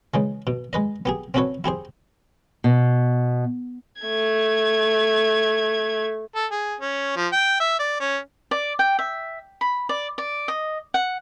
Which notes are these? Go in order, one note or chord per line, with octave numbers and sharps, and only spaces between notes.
C#3 E3 G#3
B2
G#3 B4 D#5
B3 G4 G#4
C4 C#4 F#4 A4 B4 C#5
E4 G4 G#4 C5
B2
A3 G#6
A4
G#4
C#4
F3
G5
E5
D5
C#4
D5
G5
E5
B5
D5
D5
D#5
F#5